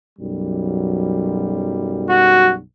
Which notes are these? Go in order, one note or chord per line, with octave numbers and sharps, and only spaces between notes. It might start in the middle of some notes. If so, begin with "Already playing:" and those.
B1 F#2 G3
F#4